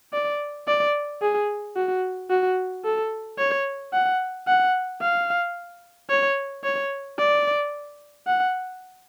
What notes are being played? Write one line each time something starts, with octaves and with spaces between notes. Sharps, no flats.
D5
D5
G#4
F#4
F#4
A4
C#5
F#5
F#5
F5
C#5
C#5
D5
F#5